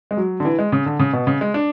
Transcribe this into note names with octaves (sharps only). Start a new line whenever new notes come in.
G#3
F#3
D3
E3
G#3
C#3
D3
C#3
B2
C#3
G#3
D4